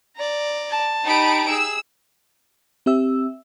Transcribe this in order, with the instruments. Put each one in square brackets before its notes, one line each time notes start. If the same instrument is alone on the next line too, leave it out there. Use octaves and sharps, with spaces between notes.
[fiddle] D5 A#5
[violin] A5
[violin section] D#4 B5 D7 [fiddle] G4
[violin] G#4 [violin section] E6
[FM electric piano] C4 G4 E5 E6